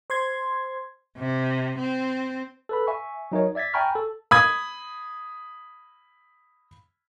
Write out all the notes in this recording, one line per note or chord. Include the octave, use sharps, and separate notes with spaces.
C5 C6 G#6
C3
C4
A4 B4 B5
E5 G#5 C#6
F#3 D#4 A#4 C#5
D5 E5 G#6 A6 B6
G5 G#5 A#5 B5 C#6 F6
A4
B5 D#6 G#6